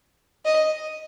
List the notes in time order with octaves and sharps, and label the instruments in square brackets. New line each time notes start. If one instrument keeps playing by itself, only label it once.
[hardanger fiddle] D#5